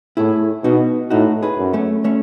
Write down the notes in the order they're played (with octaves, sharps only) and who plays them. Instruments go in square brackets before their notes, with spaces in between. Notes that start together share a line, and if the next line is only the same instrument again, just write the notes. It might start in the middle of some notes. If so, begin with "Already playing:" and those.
[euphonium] A2 [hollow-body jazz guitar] E4 G#4
[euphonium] B2 [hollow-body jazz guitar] D#4 F#4
[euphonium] A2 [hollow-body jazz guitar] D#4 F#4
[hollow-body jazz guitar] G#4 B4
[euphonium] F#2
[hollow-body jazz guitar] A3 C#4
A3 C#4